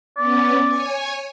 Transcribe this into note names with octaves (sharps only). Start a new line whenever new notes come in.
B3 C#4 D5
C#5 G#5